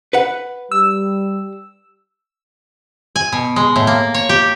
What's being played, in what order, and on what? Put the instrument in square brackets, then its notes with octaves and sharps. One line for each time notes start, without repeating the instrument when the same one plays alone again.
[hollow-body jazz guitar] B4 F#5
[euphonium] G3 [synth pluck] E6
[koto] G#5
B2
G#3
A2
A#3
C#5
G4